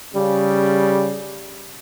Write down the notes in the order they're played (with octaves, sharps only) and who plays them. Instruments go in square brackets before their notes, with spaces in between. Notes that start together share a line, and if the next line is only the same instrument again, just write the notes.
[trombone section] C#3 G3